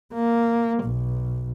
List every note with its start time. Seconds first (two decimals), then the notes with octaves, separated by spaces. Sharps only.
0.13 A#3
0.84 B1